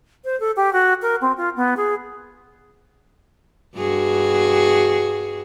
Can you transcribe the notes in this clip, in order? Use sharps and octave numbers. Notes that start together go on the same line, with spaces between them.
C5
A4
G4
F#4
A#4
C4
F4
B3
G#4
G2 F#4 G#4